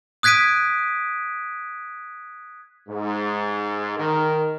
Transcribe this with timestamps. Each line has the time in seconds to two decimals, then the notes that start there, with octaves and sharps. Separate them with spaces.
0.23 D#6 F#6 G#6 B6 D7 D#7
2.89 G#2
3.97 D#3 A#4